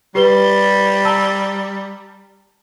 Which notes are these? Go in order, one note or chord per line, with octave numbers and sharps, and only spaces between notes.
G3 G4 B4 G7
A5 A#5 E6